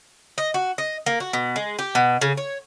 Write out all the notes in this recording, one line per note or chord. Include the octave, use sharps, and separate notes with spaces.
D#5
F#4
D#5
A#3
F#4
B2
G#3
G4
B2
C#3
C#5